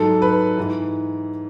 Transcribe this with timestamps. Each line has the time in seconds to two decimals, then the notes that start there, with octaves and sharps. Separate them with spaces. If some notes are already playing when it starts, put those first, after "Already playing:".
Already playing: G#2 F#3 A4
0.22 B4
0.57 G#2 E3